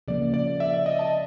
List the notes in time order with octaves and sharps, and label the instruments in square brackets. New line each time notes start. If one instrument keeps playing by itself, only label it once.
[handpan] C#3 F3 A#3 [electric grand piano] D5
[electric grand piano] D5
E5
E5
D#5
A5